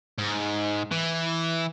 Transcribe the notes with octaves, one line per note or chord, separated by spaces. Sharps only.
G#2
E3